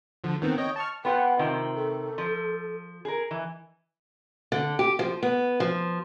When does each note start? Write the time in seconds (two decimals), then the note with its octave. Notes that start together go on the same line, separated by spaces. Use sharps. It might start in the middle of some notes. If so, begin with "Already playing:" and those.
0.24 D3 F3
0.42 D#3 B3 C4
0.58 C#5 D#5 G5
0.76 A5 C#6 F6
1.05 B3 F4 F#5 G5
1.39 C3 D#3 C4 F4
1.75 A4
2.18 F3
3.05 G#4 A#4
3.31 E3
4.52 D3
4.79 G4
4.99 F3
5.23 B3
5.60 F3